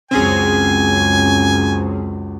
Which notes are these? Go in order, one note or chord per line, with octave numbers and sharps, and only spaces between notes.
C#2 F#2 C4 C#4 G#4 G#5